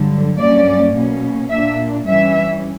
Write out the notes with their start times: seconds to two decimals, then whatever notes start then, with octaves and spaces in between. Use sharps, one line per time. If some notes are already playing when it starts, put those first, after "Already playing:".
Already playing: G2 D3 F#3
0.39 G2 F#3 A#3 C#4 D5
0.96 B2 A#3 C#4
1.51 A#2 A#3 D4 E5
2.06 G2 E3 G3 C#4 E5